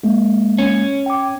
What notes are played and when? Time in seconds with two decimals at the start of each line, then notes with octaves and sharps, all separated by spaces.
0.03 G#3 A#3
0.58 C#4
1.06 G5 D6